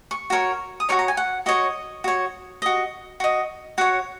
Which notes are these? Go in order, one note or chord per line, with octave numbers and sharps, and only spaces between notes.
C#6
F#4 A#4 C#5
D#6
F#4 A#4 C#5 C#6
A#5
G#5
F#5
F#4 C#5 D#5
F#4 C#5
F#4 D#5
F#4 D#5
F#4 C#5 F#5